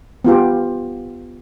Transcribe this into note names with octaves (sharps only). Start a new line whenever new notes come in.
B3 F4 G4